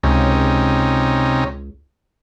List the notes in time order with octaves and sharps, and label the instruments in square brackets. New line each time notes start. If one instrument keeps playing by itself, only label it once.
[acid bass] C#2 [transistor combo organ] C3 C#4 D#4